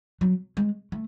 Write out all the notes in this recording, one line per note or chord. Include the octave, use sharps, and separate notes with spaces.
F#3
G#3
A3